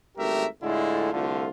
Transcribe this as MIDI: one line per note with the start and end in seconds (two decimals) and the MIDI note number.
0.17 0.46 32
0.17 0.46 43
0.17 0.46 57
0.17 0.46 67
0.17 0.46 70
0.17 0.46 76
0.63 1.10 45
0.63 1.10 50
0.63 1.10 56
0.63 1.10 57
0.63 1.10 64
0.63 1.10 65
1.13 1.49 36
1.13 1.49 50
1.13 1.49 57
1.13 1.49 65